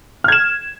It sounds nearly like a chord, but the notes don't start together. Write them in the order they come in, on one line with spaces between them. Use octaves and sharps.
F6 G#6 E7